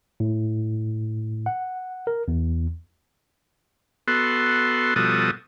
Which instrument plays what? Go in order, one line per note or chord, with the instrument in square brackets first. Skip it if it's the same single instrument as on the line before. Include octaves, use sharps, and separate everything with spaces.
[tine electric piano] A2
F#5
A#4
E2
[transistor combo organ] B3 F#4 A4 C6
B2 F3 G3 F#4 A4 D#6